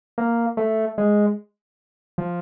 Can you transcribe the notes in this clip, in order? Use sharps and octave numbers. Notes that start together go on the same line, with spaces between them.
A#3
A3
G#3
F3